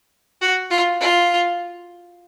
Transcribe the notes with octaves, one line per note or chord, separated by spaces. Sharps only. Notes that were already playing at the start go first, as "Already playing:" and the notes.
F#4
F4
F4